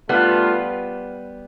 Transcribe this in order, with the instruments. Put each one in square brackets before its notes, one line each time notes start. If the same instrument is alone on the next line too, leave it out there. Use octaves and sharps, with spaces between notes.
[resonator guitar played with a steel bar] G3 B3 [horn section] A3 D4 F4 B4